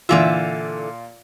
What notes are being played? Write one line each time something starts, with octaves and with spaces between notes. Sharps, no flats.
A#2 D3 E3 F4 E5